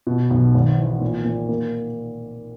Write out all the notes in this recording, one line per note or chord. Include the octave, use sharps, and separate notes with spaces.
B2
B1
G#1
E3
A#2
A#2
A#3